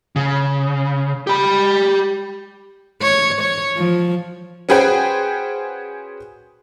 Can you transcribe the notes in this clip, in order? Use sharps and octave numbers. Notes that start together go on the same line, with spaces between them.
C#3
G4 B5
C#5
C#5
F3
C#4 F#4 G#4 B4 C5 G5